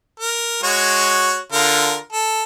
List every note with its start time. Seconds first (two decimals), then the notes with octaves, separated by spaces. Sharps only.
0.20 A#4
0.63 G#3 F#4 C#5
1.52 D3 F4 A#4
2.12 A4